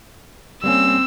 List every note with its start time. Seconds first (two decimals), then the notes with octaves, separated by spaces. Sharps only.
0.64 G3 A#3 C4 C#4 E6